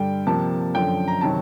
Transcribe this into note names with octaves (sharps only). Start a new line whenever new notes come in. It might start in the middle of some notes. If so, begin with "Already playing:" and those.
Already playing: G2 D3 G3 G5
C3 F3 A#3 A5
F#2 D3 F3 G5
A#5
C3 D#3 F#3 A5